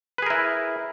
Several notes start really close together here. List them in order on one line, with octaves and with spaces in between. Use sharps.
B4 G#4 A#4 E4